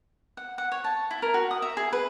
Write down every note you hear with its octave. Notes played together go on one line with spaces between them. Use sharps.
F#5
F#5
C#5
A5
E4
A#4
F#4
D#6
E5
G#4
B4